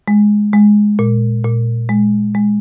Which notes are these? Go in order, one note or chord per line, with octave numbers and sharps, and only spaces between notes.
G#3
G#3
A#2
A#2
G#3
G#3